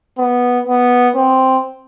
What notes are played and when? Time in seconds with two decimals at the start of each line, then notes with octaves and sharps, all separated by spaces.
0.18 B3
0.67 B3
1.16 C4